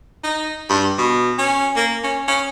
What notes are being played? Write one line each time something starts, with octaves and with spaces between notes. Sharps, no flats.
D#4
G2
B2
C#4
A#3
C#4
C#4